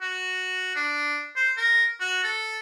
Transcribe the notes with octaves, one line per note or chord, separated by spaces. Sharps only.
F#4
D4
C5
A#4
F#4
A4